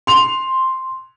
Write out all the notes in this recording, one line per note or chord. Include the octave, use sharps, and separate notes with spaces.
C6 F7